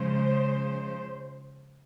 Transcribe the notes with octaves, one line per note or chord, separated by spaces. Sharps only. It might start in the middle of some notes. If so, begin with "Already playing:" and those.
Already playing: C#3 F3 G#3 C5